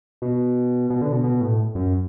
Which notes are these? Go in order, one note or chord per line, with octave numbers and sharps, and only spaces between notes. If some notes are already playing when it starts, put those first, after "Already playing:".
B2
B2
D3
B2
B2
A2
F#2